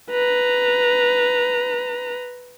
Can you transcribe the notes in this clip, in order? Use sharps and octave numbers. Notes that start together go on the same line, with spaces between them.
B4 A#5